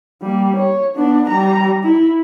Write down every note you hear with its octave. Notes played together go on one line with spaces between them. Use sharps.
G3 A#3
C#5
B3 D4
G3 A#5
E4